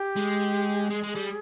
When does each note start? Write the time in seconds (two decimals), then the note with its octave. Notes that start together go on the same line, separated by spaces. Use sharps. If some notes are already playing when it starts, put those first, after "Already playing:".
Already playing: G4
0.16 G#3
0.90 G#3 G#4
1.03 G#3
1.15 G3